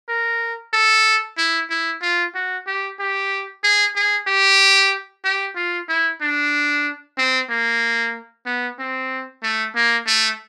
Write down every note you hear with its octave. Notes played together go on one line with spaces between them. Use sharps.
A#4
A4
E4
E4
F4
F#4
G4
G4
G#4
G#4
G4
G4
F4
E4
D4
C4
A#3
B3
C4
A3
A#3
A3